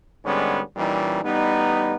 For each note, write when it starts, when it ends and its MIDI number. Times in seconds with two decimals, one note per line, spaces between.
0.25 0.60 44
0.25 0.60 50
0.25 0.60 55
0.25 0.60 56
0.25 0.60 59
0.25 0.60 61
0.76 1.19 46
0.76 1.19 52
0.76 1.19 55
0.76 1.19 61
0.76 1.19 63
1.23 1.95 33
1.23 1.95 55
1.23 1.95 59
1.23 1.95 63